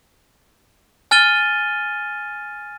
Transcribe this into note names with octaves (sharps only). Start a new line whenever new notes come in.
G#5 F6 A6 D#7 G7